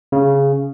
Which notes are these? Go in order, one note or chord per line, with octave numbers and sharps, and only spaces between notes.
C#3